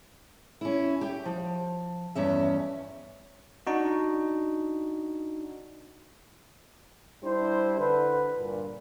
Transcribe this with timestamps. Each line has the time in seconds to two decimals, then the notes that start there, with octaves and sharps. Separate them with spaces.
0.61 C#4 E4
1.01 G4 G5
1.25 F3
2.15 E2 G2 C#4 E5
3.67 D4 D#4 F#4
7.23 G3 D4 E4 C5
7.78 D3 B4
8.37 G2 A#2